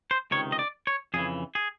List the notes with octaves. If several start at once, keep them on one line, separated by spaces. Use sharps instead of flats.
C5
C#2 C3 D#3 C#5
D#5
D5
C#5
F2 C#3 E3 G#4
G#4